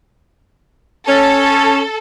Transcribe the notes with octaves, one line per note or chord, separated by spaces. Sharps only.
C#4 A4